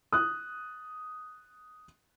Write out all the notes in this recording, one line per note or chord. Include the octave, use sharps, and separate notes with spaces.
D#6 F#6